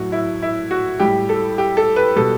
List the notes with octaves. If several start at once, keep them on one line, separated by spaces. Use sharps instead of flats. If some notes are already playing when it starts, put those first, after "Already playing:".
Already playing: A2 F#3 F#4
E4
E4
F#4
A2 G3 G4
A4
G4
A4
B4
B2 G3 A4